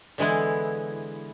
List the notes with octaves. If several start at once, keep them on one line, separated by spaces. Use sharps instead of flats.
D3 E3 G#3 B3 E4